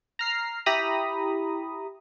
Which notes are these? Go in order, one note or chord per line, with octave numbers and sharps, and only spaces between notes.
A#5 F6 C7
E4 G4 A#5 B5 D#6